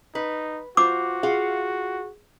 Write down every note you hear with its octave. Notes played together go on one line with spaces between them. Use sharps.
D#4 B4
F4 F#4 C5 D6
F4 G#4 F5 F#5